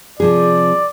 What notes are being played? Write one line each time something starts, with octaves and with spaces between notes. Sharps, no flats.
C3 F3 G#4 D5